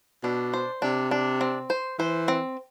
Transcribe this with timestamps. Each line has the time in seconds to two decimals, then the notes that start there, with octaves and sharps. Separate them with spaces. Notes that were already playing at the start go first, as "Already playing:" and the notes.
0.23 B2 D4
0.54 C5
0.82 C3 D4
1.11 D4
1.41 C4
1.70 C5
1.99 E3 C5
2.28 C4